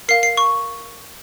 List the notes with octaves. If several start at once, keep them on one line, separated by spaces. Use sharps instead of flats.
A#4 F5 C7
C7
C#6